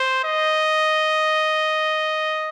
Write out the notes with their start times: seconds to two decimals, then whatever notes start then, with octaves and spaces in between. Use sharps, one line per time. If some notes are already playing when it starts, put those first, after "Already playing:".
Already playing: C5
0.25 D#5